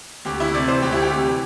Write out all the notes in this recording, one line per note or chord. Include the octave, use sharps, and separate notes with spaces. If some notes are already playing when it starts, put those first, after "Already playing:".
D2 G4
D2 E4
C3 D5
E3 C5
D2 G4
D2 E4
G4
C3
E3